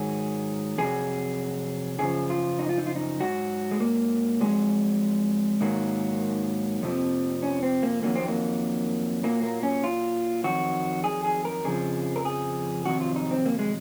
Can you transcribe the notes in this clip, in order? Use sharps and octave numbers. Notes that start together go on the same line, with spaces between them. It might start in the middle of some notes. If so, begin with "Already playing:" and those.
Already playing: G#2 D#3 F#3 G#4
F2 C3 F#3 G#4
F#2 C#3 F3 G#4
F4
D#4
F4
D#4
F4
D#4
G#2 F#3 F#4
G#3
A#3
F2 C3 F#3 G#3
G#2 D#3 F#3 A#3
F2 C3 F3
C#4
C4
A#3
F2 D#3 F#3 A#3
C4
A#3
A#2 F#3 A#3
A#3
C#4
F4
F2 D#3 F#3 F#4
G#4
G#4
A#4
F2 C#3 F3 G#4
A#4
G#4
F2 C3 D#3 F#3 F#4
F4
D#4
C4
A#3
G#3